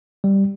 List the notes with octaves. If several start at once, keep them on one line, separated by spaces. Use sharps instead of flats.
G3